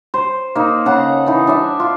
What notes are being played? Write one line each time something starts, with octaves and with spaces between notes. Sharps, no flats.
C5
A#3 D#4
C#3 A4 F#5 A#5
E3 D#4
D4 D5 E5
F4